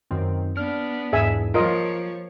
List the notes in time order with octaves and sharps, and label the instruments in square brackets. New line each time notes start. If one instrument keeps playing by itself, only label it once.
[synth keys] F#2 D#3 C4
[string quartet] B3 D4 [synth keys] F6
[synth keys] E2 G#2 [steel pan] G#4 E5 G#5
[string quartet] F3 C#5 [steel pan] F4 A#4 D#5 [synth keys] D7